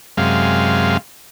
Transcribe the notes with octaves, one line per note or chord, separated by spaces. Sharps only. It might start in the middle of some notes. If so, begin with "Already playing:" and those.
F#2 C3 G#3 F5